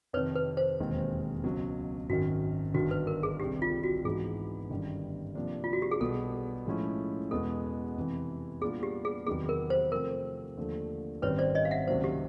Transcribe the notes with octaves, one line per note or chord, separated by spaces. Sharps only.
F2 C3 D#3 B4 C#5
B4
C5
E1 D#2 D#3 G#3 C4
C#2 B2 F#3
G#1 F#2 D#3 F#4
G1 G2 D#3 F#4
B4
A#4
G#4
C2 C3 D#3 G3 C4 G4
F4
F#4
G#2 E3 G#3 B3 D#4 G#4
G1 F#2 D#3 G3
C3 F3 A#3 D4
F4
F#4
G4
G#4
B1 B2 G3 B3 A4
A2 F3 G#3 C#4 E4
E2 B2 G#3 B3 A4
F2 C3 E3
A#2 G3 B3 D4 F4 G#4
G4
G#4
E2 C3 D#3 F#3 B3 G#4
A#4
C5
C3 F3 A3 C4 A#4
D#2 D3 F3 A3
G#1 F#2 D#3 G3 C4 B4 C#5
C5 D5
C#5 D#5
F5
E5 F#5
C#2 C3 D#3 F#3 A#3 C5
G4